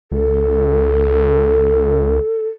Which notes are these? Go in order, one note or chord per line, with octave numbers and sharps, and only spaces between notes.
C#2 A4